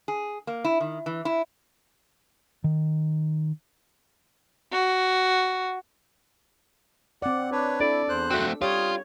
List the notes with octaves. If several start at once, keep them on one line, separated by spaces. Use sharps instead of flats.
G#4
A#3
E4
D#3
E3
E4
D#3
F#4
C4 D5 F#5
D4 B4 C#5
D4 E4 A4 D5
E2 C5 F#6
A3 C4 F#4
G3 F4 C#5 D#6